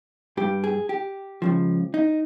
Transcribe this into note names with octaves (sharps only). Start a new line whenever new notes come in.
G2 G3 G4
G#4
G4
C#2 C#3 F3
D#4